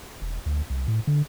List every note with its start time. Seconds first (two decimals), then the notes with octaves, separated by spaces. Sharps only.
0.22 E1
0.46 D2
0.70 C2
0.88 A2
1.07 D3